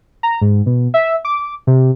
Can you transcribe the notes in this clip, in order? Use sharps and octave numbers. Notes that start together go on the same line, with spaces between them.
A#5
G#2
B2
E5
D6
C3